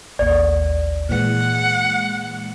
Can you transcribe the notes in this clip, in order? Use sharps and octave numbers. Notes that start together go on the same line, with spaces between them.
A1 D#2 D5
A#2 E3 G#3 F#5